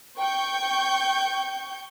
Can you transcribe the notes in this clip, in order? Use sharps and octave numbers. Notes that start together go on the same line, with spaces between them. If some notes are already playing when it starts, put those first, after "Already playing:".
G5 C#6 G6